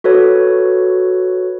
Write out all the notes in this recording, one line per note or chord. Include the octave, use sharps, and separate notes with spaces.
F#4 A4 B4 C#5